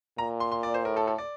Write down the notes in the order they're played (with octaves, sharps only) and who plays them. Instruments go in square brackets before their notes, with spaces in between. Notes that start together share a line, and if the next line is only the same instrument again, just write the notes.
[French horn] A#2 [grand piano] A#5
[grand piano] C6
C6
D5
C5
[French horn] A2 [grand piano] A#4
[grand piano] A4
A4
D5